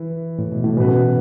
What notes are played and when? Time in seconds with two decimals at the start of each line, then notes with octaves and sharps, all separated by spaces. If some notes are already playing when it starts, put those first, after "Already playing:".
Already playing: E3 E4
0.39 A2
0.52 B2
0.64 A2
0.77 B2 E3 C#4 F#4 B4